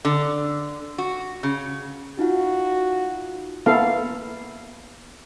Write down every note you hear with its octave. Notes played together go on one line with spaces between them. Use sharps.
D3
F#4
C#3
D#4 F4 F#4 F#5
A#3 B3 E4 A4 F5